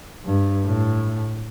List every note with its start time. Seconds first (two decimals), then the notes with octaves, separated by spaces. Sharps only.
0.26 G2
0.65 A2